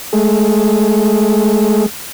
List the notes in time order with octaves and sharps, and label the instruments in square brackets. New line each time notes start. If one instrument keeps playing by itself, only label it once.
[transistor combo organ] G#3 A3